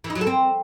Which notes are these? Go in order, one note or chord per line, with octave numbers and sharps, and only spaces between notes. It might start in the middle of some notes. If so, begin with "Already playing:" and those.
E3
D#4
F#3
A4
C4